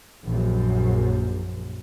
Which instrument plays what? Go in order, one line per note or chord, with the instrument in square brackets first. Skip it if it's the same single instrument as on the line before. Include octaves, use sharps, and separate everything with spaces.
[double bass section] A#1 F#2